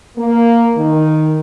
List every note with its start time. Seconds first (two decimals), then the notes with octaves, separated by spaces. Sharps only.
0.17 A#3
0.76 D#3